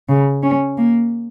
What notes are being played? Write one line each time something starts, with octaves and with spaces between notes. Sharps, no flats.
C#3
C#4
A#3